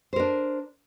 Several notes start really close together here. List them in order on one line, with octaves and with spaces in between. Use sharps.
C5 A#4 D4